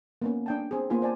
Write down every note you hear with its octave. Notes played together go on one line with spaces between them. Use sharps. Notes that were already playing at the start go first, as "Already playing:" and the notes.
A#3 B3 C#4
D4 G5 A5
C4 G#4
A#3 B3 F4 C5 G#5
C5 D5 G#5 A5